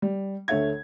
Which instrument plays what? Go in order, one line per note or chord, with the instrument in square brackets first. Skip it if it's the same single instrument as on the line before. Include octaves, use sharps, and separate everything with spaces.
[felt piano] G3
D2 A3 C#5 E5 G#6